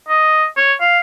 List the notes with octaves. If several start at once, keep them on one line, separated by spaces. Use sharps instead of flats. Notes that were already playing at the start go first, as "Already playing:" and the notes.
D#5
C#5
F5